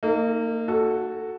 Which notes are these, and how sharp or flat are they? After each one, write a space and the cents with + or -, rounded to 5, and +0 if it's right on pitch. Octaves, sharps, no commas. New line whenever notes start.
A#3 -30 D#4 +0
F#4 +0 A4 +0